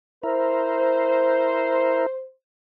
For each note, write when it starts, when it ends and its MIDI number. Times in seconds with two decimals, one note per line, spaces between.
0.23 2.06 64
0.23 2.06 70
0.23 2.28 72